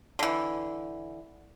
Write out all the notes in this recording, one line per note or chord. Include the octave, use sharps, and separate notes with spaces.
D3 E3